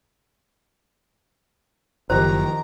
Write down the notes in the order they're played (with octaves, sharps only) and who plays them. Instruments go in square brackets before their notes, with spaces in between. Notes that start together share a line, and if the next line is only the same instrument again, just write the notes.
[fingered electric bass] F#1 [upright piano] D#3 F3 G4 [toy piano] C5 [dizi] A#5